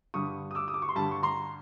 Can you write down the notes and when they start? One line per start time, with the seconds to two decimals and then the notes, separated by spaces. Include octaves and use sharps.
0.14 G2 D3 G3 C#6 D#6
0.51 D#6
0.55 D6 E6
0.68 D#6
0.74 D6
0.82 C#6
0.89 C6
0.95 G2 D3 G3 A5 B5
1.11 C#6
1.23 A#5 C6